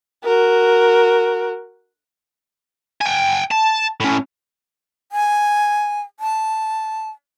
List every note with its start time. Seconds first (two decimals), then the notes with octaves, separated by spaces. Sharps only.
0.24 F#4 A#4
3.01 G5 G#5
3.51 A5
4.00 A2 C#4
5.12 G#5
6.20 A5